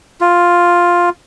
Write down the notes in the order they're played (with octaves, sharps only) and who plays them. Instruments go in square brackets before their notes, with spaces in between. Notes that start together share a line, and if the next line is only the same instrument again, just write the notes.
[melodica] F4